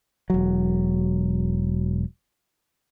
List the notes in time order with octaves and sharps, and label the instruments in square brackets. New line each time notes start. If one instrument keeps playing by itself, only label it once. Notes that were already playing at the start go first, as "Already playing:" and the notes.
[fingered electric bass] E1 F#3